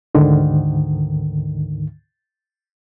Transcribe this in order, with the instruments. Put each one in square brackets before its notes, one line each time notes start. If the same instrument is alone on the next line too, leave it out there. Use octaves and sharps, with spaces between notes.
[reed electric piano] D2 G#2 D3 D#3